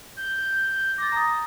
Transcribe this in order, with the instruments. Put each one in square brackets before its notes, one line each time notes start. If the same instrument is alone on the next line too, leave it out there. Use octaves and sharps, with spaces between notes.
[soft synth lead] G6
[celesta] D6 A6 [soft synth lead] A#6
[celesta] A#5 D#6